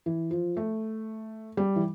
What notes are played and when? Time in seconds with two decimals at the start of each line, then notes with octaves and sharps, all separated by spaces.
0.06 E3
0.31 F3
0.57 A3
1.57 G3
1.76 E3